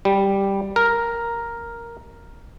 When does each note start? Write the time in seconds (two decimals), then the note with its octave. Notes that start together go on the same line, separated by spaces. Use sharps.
0.05 G3
0.76 A#4